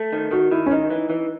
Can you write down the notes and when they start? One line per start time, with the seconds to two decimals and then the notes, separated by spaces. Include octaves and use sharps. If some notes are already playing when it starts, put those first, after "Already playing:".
Already playing: A3
0.13 D#3
0.31 D#3 F#4
0.51 D#3 E4
0.66 C#4
0.71 D#3 D#4
0.90 E3
1.10 E3